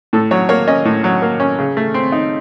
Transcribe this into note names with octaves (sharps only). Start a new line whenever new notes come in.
A2 A4
F#3 C#5
A#3 C#5
C#4 D#5
A2
F#3
A#3
C#4
C#3
A3
C4
D#4